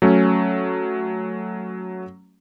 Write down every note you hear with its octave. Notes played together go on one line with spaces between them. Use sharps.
F#3 A3 C#4